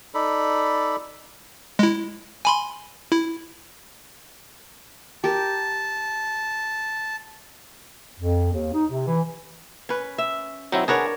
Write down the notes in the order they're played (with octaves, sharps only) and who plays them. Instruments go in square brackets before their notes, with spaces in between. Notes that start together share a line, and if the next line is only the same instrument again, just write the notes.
[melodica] D#4 A4 D5 B5
[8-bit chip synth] G#3 E4
G#5 B5 C6
E4
[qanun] G4 A#4 [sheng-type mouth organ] A5
[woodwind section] F2
D#2
D#4
C3
E3
[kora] C#4 B4
E5
[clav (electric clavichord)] F#3 C4 E4 [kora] D#4
[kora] D4 A#4 C#5 [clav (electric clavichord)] G#4 B4 F#5